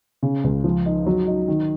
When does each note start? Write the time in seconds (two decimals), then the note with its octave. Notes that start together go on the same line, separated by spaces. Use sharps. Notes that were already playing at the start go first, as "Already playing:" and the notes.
0.23 C#3
0.44 C#2
0.64 F3
0.86 D#4
1.06 F#3
1.27 D#4
1.48 D#3